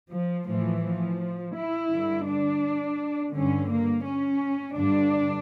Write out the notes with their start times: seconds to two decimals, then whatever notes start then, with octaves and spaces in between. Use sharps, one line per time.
0.11 F3
0.47 A2 E3 F3
0.83 F3
1.54 E4
1.91 G2 D3
2.26 D4
3.33 G2 D3 C#4
3.69 A#3
4.05 C#4
4.76 G2 D3 D4